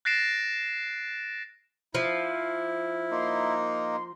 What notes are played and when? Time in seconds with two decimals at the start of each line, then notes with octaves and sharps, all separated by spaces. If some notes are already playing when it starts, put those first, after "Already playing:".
0.05 F#6 A6 A#6 C7 D7 E7
1.95 F3 E4
3.11 A#3 D#4 C6